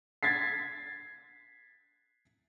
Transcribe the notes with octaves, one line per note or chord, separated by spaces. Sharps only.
G#6 A6 B6 C7